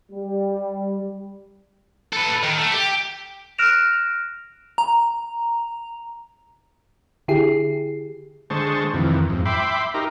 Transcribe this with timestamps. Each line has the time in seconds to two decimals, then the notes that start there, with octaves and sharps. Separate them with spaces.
0.12 G3
2.13 A4 B4
2.43 D#3
2.58 A3
2.72 G4
3.58 F6 F#6 A#6 D7 E7 F7
4.78 A#5
7.28 D3 E4 G4 G#4 C7
8.50 D3 G#3 C5 A5 C#6
8.94 F2 C3 D#3 E3
9.30 F2 G#2
9.45 E5 G5 B5 C6 D6
9.94 D#4 G4 A#4